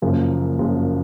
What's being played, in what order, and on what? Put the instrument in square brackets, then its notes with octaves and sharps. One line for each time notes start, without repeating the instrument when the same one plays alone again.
[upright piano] F#1 F#2 F3 A#3
F#1 F#2 F3 A#3